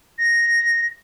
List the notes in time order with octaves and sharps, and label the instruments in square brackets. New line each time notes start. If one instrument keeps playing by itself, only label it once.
[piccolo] A#6